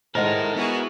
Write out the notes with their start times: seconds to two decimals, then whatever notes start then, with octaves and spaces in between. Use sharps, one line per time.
0.15 D#3 G#3 E4 A4 A#4 C5 D#5 F#5
0.55 B3 E4 F#4 G#4